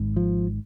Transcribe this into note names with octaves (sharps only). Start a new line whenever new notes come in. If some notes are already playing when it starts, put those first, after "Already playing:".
Already playing: G#1 G#2
F3